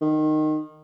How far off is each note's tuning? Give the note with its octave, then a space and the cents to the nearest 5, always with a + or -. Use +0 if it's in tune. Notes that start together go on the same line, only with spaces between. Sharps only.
D#3 -15